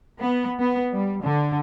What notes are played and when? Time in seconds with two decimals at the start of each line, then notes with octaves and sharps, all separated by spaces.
0.19 B3
0.60 B3
0.92 G3
1.21 D3